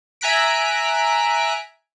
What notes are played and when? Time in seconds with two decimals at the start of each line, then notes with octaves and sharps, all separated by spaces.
0.21 E5 G#5 A#5 F#6 B6 D7